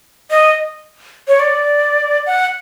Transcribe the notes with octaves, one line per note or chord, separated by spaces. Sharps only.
D#5
C#5
D5
F#5